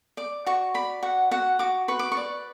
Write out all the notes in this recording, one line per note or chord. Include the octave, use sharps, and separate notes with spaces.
D5 D6
F#4 C#6
D5 B5
F#4 F#5
F#4 F#5
F#4 D6
B4 C#6
D6
C#6
D5